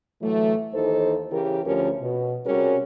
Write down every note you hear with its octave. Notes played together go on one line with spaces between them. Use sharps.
A2 E3 F#3 A3
D#2 E3 D#4 A4 C5
C#3 E3 G4 A#4
D2 F3 C#4 G4 A#4
B2
C3 G3 C#4 F#4 G#4 A#4